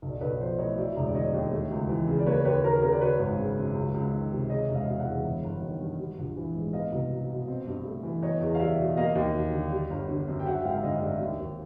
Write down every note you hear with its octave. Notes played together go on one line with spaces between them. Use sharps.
B1
D5
B1 B4 C#5
F3 C5 D5
A2 C#5 D#5
F#3 D5 E5
E1
D5
D3 C#5 D#5
D#2
A3
C#2
E3
C#3
D5
A#3 B4 C#5
D#2 B4 C#5
F#3 A#4
C#3 A#4
D5
F#3 B4 C#5
G#1
C#3
F#2
C#2
C#2
D#3
C3
G#3 C#5 D#5
E1 E5
D#5 F5
B2 F5
E5 F#5
E2
G1
G1
D#3
G2
G3
A#1
E3
G#2
B3 D#5 F5
C2
F#3
B2
C4
G2
A3
E3
B3 C#5 D#5
E2
F5
G3 D5 E5
B2
A#3 D#5 F5
D#2
F#3
D3
G3
G1
D3
F#2
G5
F#3 E5 F#5
G#1 F5 G5
D3 D#5 F5
F5
G2 D5 E5
D#2
D#2